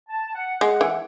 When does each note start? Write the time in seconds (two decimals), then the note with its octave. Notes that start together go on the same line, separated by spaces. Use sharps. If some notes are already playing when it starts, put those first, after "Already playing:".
0.09 A5
0.35 F#5
0.61 G#3 F#5
0.81 E3